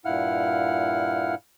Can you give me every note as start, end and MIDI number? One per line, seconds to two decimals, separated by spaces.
0.05 1.35 43
0.05 1.35 46
0.05 1.35 64
0.05 1.35 77
0.05 1.35 78
0.05 1.35 89